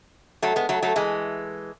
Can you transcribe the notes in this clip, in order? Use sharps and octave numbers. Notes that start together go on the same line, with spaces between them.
F#3 A3
G#3 B3
F#3 A3
F#3 A3
E3 G#3